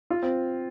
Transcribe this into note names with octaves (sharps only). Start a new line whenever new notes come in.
F4
C4